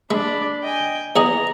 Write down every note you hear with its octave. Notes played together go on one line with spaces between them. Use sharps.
G#3 D4 D5 B5
D#5 G5 G#5
E2 B3 G#4 D#5 A#5